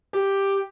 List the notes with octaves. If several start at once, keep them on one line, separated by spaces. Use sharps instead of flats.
G4